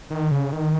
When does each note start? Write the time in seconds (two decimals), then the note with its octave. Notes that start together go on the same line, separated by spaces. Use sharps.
0.10 D#3
0.31 C#3
0.53 D#3